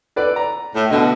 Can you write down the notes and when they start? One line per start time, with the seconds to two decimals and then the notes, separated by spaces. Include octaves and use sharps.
0.16 A4 B4 D5
0.36 A#5
0.74 A2
0.90 B2 D3 D#5